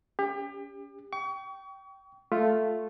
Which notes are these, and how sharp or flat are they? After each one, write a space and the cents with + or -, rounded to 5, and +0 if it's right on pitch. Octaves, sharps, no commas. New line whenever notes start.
C#4 +30 G4 +35
G5 -15 C#6 +35
A3 +0 F4 +0